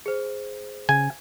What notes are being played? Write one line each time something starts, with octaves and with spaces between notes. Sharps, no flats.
G#4 C5
C#3 G#5